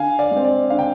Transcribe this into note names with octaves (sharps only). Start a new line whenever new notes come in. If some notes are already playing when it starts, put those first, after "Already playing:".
Already playing: D3 F5 G#5
D5 F5
G#3
C4
D5
D3 F5
G5